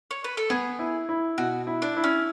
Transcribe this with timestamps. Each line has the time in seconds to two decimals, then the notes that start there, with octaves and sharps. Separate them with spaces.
0.11 C#5
0.24 B4
0.37 A4
0.50 B3 G#4
0.79 E4
1.09 E4
1.38 B2 F#4
1.67 E4
1.82 D4
1.97 E4
2.04 C#4